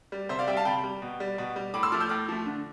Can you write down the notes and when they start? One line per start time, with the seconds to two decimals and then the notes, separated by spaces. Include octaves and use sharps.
0.12 G3
0.29 C3 C5 E5
0.39 D5 F5
0.47 G3 E5 G5
0.57 F5 A5
0.65 C3 G5 B5
0.84 G3
1.02 B2
1.20 G3
1.38 B2
1.56 G3
1.74 A2 B5 D6
1.83 C6 E6
1.92 F3 A3 D6 F6
2.00 E6 G6
2.09 A2 D6 F6
2.28 F3 A3
2.46 D3